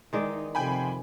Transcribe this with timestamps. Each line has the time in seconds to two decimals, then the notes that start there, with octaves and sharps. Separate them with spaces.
0.13 D#3 E3 G#3 D#4 D5
0.55 F2 C3 G5 G#5 B5